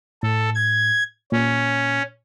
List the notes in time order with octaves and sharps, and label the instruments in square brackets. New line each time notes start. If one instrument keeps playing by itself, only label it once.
[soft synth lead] A2 [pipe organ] A4
[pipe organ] G#6
[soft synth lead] A#2 [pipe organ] C#4